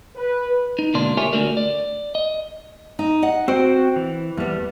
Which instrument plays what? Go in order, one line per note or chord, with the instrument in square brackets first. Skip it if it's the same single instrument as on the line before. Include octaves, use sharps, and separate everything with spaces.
[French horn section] B4
[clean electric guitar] D#4
D2 G#2 B2 A#3 D4 C6
F4 G4 A#4 C#5 E5 G#5
D3 A3 F#4 A#4 D5
D5
D#5
[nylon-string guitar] D#4
D#5 F#5
[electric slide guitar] C4 F#4 G5 [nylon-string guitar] C5
[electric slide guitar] E3
[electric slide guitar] E2 G3 [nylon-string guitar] A3 B3